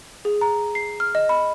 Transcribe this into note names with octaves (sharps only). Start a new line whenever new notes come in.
G#4
A#5
C7
F6
D#5
B5